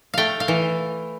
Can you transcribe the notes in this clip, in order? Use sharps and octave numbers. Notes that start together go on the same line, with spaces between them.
A3 F5 G5
F5
E3